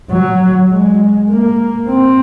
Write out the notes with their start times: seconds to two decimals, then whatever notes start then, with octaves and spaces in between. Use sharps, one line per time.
0.11 F#3
0.71 G#3
1.30 A#3
1.89 C4